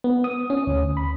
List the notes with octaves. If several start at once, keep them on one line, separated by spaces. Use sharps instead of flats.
B3
D#6
C#4
D2
B5